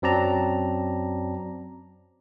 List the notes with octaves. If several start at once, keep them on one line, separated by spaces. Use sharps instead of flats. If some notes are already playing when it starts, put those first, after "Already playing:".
F#2 F#3 C4 D5 A5 A#5